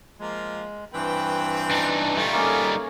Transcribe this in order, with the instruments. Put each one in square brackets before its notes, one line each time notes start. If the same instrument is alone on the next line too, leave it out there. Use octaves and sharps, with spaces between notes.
[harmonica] F3 A#3 [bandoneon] G#3
[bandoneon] G2 E3 [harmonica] C4 B4 G5
[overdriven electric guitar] D4 D#4
[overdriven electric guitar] G3 D#4 [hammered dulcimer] A3 [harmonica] F4
[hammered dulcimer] A#3 C#4 G#4